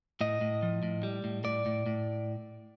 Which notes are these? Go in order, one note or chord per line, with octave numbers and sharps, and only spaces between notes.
A2 D#5
A2
F3
A2
G3
A2
A2 D5
A2
A2